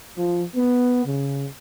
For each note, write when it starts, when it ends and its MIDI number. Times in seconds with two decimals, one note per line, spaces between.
0.17 0.40 53
0.54 1.03 59
1.04 1.44 49